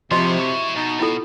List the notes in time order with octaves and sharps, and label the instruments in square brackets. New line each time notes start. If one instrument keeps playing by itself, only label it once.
[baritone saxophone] C3 [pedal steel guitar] F3 [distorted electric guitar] E4 C#5 [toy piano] F#4 D#5 C6
[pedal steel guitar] C#6
[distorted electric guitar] B2 [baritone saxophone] D#4
[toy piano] E4 F4 A4